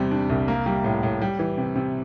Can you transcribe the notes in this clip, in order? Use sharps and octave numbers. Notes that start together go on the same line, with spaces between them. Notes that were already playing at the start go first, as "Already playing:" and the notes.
Already playing: E2 C3 G3
D4
C2
A#3
G3
A2
A2
G3
E3
C3
C3